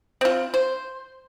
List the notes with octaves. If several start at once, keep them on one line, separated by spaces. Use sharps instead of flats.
C4 F4
C5